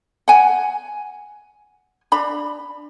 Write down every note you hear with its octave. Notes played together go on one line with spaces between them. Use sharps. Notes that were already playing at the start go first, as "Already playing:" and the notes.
F#5 G#5
D4 B5